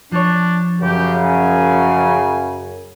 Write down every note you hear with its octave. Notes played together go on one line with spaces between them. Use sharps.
F3 D4 C#5
F#2 C#3 G4
G#5